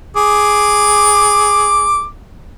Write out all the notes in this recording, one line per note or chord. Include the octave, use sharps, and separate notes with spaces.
G#4 D6